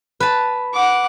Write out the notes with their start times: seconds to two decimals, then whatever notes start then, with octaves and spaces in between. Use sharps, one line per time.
0.20 B4 A5
0.74 F#5 D6